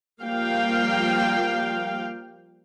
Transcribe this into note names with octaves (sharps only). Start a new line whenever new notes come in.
F3 G3 A#3 F5 G5